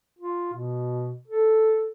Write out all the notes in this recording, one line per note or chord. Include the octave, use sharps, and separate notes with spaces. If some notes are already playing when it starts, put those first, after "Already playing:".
F4
B2
A4